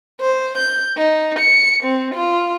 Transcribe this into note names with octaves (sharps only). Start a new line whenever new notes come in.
C5
G6
D#4
C#7
C4
F4